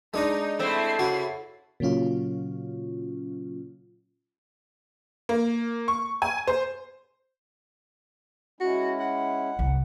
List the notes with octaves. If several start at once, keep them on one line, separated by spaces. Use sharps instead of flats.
G#3 D4 D#4 D#6
A3 C4 E4 C7
C#3 F#4
A#2 C#3 F#3 C#4 F4
A#3
C#6
G#5
C5
G#3 C#4 E4 F#4
F#5
C2